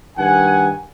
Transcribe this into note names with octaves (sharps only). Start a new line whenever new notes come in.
G2 D#3 F#5 G#5